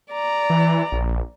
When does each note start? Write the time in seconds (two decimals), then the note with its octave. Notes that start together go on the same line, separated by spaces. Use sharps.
0.11 D5 A#5
0.50 E3
0.92 A#1